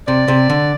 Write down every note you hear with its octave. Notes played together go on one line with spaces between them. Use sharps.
C3 D5
C3
D3